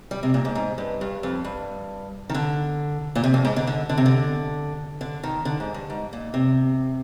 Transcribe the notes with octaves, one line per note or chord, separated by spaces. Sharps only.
G3
C3
A#2
G#2
G#2
G2
G2
F2
G2
D#3
D3
A#2
C3
F2
G#2
D3
D3
D3
C3
D3
D3
D#3
D3
G#2
G2
G#2
A#2
C3